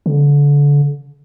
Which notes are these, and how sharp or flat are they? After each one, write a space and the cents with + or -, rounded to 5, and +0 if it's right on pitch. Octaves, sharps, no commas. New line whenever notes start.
D3 -30